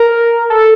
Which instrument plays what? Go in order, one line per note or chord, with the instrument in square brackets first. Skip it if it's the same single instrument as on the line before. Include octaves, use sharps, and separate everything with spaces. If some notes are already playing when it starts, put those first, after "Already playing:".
Already playing: [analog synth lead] A#4
A4